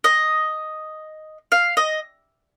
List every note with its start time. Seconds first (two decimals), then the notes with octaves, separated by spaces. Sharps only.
0.04 D#5
1.52 F5
1.77 D#5